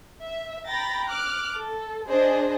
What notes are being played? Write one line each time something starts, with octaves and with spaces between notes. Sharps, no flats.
E5
G5 A#5 B5 A6 A#6
D6 F6 F#6
A4
D4 G#4 C5 D#5